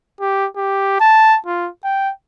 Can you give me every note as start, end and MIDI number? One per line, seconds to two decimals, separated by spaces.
0.20 0.47 67
0.56 0.99 67
1.00 1.38 81
1.46 1.69 65
1.84 2.11 79